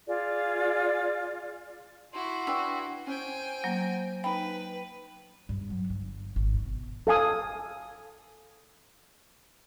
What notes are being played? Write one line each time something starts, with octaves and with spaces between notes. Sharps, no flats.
F4 G#4 D5
E4 F#4 C6
D4 B4 G5 C#6 E6
C#4 C5 G5 G#5
F#3 A#3
D#4 B4 G5 B5
G2
F#3
G1
G#1
B2
A4 F5 G#5 D#6